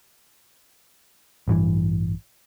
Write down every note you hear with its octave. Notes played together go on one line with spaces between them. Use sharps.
A1 G2 E3